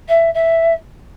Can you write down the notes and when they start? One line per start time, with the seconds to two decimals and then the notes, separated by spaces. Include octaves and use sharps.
0.09 E5
0.34 E5